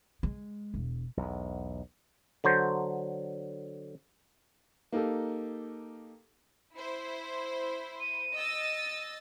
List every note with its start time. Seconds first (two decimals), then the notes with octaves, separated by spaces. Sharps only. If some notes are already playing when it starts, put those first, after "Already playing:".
0.23 G#3
0.74 E1
1.17 B1 E2
2.44 D3 F#3 C5
4.92 A#3 D#4 G4 A4
6.76 E4 C5
8.00 D#7
8.34 D#5 E6 A6